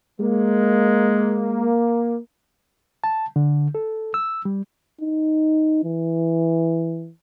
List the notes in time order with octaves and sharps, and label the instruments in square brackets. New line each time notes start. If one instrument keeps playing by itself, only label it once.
[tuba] G#3 [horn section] A#3
[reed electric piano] A5
D3
A4
E6
G3
[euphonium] D#4
E3